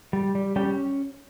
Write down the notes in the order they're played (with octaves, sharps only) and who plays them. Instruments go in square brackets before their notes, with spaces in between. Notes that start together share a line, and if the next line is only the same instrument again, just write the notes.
[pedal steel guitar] G3
G3
G3 C#4 G4